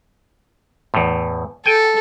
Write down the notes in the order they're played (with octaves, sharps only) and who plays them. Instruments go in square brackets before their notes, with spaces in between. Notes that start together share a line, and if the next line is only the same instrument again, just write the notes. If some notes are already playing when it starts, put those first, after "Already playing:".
[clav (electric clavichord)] E2 A2
[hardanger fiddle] A4 [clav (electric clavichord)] G5 G#5